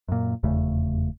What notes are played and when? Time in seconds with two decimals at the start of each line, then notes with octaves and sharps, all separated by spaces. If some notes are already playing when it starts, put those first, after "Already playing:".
0.08 F#2 A#2
0.43 F1 E2 C#3 A3